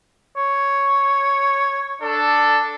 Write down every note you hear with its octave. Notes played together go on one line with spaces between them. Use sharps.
C#5
D4 A4